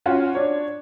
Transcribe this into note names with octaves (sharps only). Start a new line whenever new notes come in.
C#4 F4 F#4
D4 C#5